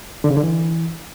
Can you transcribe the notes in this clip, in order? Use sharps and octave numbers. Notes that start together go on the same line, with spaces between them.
D3
C#3
D3
E3